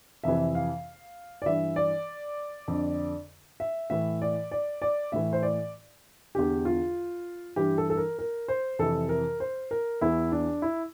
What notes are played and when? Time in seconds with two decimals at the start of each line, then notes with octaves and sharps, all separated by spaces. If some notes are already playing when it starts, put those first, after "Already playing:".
0.24 F2 C3 E3 E5
0.55 F5
1.42 D5
1.46 G2 E3 E5
1.76 D5
2.68 F2 D3
3.60 E5
3.90 A2 E3 E5
4.22 D5
4.51 D5
4.82 D5
5.12 A2 E3 E5
5.33 C5
5.43 D5
6.35 E2 D3 G4
6.65 F4
7.56 G2 E3 G4
7.78 A4
7.90 A4
7.97 A#4
8.19 A#4
8.48 C5
8.79 F2 C3 E3 A4
9.09 A#4
9.40 C5
9.71 A#4
10.01 E2 E3 E4
10.32 D4
10.62 E4